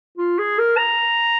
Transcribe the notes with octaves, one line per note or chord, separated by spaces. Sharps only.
F4
G#4
A#4
A#5